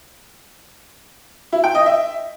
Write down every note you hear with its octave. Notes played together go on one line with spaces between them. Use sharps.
E4
G5
D#5
E5